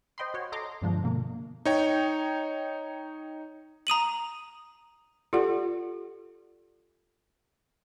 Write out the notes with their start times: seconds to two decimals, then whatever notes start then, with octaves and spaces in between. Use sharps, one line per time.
0.18 C5 D#5 G5 B5 C6
0.34 F#4 C#5
0.52 A4 D#5 A#5 C6 D6
0.81 G2 B2 D3 F3 G#3 D4
1.03 B2 D3 A#3
1.65 D#4 C#5 G5
3.87 A#5 D#6 D#7 F#7
5.33 F4 G4 A4 D5 F#5